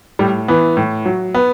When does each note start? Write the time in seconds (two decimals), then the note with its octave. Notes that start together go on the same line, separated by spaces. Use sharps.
0.19 A2 G3
0.48 E3 B3
0.77 A2
1.06 F#3
1.35 B3